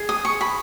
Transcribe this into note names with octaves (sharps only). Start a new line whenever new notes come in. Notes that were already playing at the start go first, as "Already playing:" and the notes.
Already playing: G#4
D#6
C#6
B5